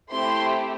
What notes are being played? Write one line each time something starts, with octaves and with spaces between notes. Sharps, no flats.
A3 C4 E4 G4 C6